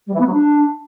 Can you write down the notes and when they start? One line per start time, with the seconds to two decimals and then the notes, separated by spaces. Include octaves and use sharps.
0.07 G3
0.13 E3
0.20 B3
0.26 F#3
0.33 D4